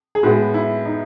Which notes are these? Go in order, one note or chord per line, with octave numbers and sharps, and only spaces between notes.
G#4
A2 G#3 B3 F#4
E4
D#4